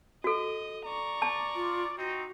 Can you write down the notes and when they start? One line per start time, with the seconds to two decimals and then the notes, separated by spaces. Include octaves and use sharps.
0.24 F#4 A4 D#5
0.85 D5 A#5 C#6
1.22 A5
1.55 F4
1.97 C4 D#4 F#4